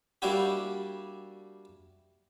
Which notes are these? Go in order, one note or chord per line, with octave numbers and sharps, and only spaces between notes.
G3 A#3 D4 E4 F#4 G4